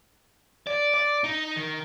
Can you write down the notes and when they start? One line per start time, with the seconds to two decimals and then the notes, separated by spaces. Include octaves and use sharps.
0.67 D5
0.94 D5
1.24 D#4
1.56 D#3